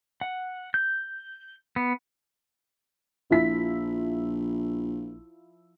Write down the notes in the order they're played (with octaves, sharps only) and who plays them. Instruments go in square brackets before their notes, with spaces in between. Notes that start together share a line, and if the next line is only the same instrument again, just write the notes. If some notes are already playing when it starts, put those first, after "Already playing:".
[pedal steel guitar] F#5
G6
B3
[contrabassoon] A#1 [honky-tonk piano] F3 E4 B6